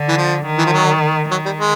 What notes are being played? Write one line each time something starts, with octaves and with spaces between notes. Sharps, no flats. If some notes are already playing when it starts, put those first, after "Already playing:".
Already playing: D3
E3
F3
D#3
E3
F3
F#3
D#3 F#3
G3
G#3